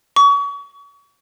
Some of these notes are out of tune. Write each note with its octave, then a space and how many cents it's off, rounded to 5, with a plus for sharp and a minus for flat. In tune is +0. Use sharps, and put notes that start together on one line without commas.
C#6 +35